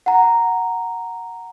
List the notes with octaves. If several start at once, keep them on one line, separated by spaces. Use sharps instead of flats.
F#5 A#5